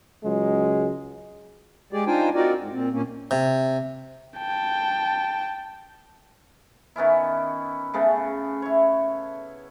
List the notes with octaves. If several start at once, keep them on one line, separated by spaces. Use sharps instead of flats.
C#2 F#3 G#3
G#3 G4 G#4 D5
D4 D#4 F4 C5 G5 G#5
C4 D#4 F4 F#4 A#4 D5
G#2
A#2 C4
A#2 A#3 C#4
C3
G5 A5
D#3 B3 C#4 E4
C#3 A3 B3 C#4
E4 C#5